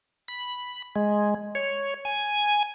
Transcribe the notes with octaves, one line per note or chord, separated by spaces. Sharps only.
B5
G#3
C#5
G#5